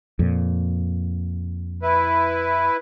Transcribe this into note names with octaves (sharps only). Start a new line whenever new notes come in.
F2 A#2
E4 B4